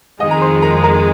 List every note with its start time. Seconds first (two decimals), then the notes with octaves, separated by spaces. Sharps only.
0.20 F2 D#3 G#3 D#5 D#6
0.31 A#5
0.41 C5 C6
0.62 A#4 A#5
0.83 A#4 A#5